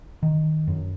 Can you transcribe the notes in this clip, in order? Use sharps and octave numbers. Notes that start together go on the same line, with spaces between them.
D#3
F#2